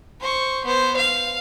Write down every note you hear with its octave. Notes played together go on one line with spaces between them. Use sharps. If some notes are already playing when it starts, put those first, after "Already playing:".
C5 C#6
B3 C5
F5